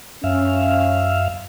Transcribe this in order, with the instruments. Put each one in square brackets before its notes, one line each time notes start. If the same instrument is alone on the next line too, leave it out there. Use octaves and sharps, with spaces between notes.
[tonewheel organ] F#2 E5 F5 [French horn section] C#4